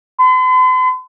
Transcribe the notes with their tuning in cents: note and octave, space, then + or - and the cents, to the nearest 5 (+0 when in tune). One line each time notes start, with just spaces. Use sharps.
C6 -45